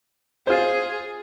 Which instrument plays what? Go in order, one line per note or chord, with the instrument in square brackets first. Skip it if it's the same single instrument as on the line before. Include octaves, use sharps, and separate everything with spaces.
[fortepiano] F4 C5 [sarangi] G#4